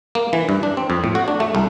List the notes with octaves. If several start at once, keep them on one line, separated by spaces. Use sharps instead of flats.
A#3
E3
G2
D4
C4
F2
A2
F#4
D4
A3
C2